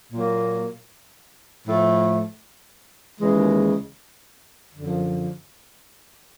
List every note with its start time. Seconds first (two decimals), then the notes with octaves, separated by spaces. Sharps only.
0.13 A#2 F#3 A#3
1.66 A2 F3 A3
3.20 D#2 C#3 E3 G#3
4.73 F#2 D3 F3